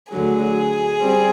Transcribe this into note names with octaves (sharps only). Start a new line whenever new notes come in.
D2 D3 F#3 G#4
G3 C4